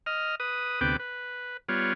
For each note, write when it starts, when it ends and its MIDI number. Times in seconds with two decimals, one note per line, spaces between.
0.06 0.35 75
0.06 0.35 89
0.40 0.80 71
0.40 0.80 87
0.81 0.97 38
0.81 0.97 48
0.81 0.97 59
0.81 0.97 71
0.81 0.97 79
0.81 0.97 86
0.99 1.57 71
1.69 1.93 55
1.69 1.93 59
1.69 1.93 65
1.69 1.93 73